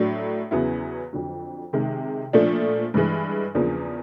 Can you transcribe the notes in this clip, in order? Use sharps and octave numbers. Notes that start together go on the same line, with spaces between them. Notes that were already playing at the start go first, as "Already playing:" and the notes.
Already playing: A2 F#3 A3 D4
E2 C#3 F#3 B3 E4
F2 D3 F#3
C3 D#3 G#3
A#2 F3 A3 D4
G2 E3 G#3
E2 C#3 F3 A#3 D4